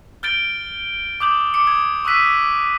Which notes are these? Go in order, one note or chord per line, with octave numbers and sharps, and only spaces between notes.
F6 G6 A6 D7 G7
D6 D#6 G6 F#7
D6 C#7
D#6 G#6
C#6 D#6 E6 F#6 B6 D#7